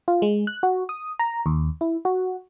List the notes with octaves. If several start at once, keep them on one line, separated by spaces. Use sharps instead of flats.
F4
G#3
F#6
F#4
D#6
A#5
D#2
E4
F#4